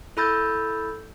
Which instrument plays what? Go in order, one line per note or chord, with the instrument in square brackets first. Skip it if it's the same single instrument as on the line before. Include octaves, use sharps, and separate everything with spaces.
[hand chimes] E4 A4 B5 E6 G6 A6